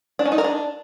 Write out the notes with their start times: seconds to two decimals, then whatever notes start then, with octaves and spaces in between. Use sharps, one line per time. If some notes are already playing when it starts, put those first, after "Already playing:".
0.19 D4
0.26 C#4
0.32 D#4
0.38 A#4
0.44 D4